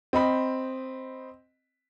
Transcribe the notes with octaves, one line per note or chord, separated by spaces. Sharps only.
C4 D#5 B5